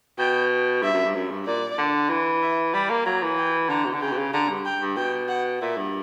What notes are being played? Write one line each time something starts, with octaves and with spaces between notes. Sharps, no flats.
B2 G5
G2 E5
F#2
G2
F#2
G2
A#2 D5
D3
E3
E5
G3 B5
A#3
F#3 A#5
E3
G5
D3 A#5
B2
D3
C#3 G5
B2
C#3
D3 A#5
G2
G5
G2
B2 G5
F#5
A#2 E5
G2